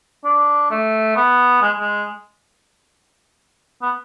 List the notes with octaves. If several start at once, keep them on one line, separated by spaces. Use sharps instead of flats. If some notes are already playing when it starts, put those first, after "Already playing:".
D4
A3
B3
G#3
G#3
B3